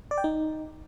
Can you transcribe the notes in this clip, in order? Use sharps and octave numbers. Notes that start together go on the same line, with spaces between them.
D5
G5
D#4